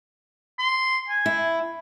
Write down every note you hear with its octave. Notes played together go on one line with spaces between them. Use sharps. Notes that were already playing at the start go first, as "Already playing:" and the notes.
C6
G#5
E4